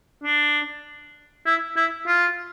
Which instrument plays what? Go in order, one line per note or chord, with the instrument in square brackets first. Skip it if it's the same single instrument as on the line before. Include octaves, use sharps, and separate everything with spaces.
[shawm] D4
E4
E4
F4